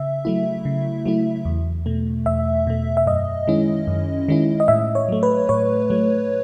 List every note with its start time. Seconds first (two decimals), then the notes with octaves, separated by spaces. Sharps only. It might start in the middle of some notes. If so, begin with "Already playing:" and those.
Already playing: C#3 E5
0.25 F#3 A3 E4
0.65 C#3
1.06 F#3 A3 E4
1.45 E2
1.86 B2 A3
2.26 E2 E5
2.67 B2 A3
2.97 E5
3.07 F#2 D#5
3.47 D#3 G#3 C#4 E4
3.87 F#2
4.28 D#3 G#3 C#4 E4
4.60 D#5
4.68 A2 E5
4.95 C#5
5.09 F#3 A3
5.23 B4
5.49 A2 C#5
5.90 F#3 A3